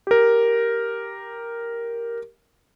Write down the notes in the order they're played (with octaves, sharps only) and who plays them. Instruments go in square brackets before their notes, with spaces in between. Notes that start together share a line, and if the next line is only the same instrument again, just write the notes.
[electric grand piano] G4 A#4